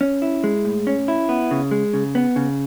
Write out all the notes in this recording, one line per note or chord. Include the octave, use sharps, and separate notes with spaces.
C#4
E4
G#3
A2
C#4
E4
B3
C#3
G#3
C#3
B3
C#3